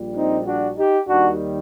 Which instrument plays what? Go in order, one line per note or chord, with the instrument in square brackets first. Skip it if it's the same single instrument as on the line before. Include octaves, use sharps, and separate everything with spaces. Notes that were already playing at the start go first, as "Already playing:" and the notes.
Already playing: [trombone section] A#1 A#2 G3
C4 D#4
D4 F#4
D#4 G4
D#2 D#3 G3 D4 F#4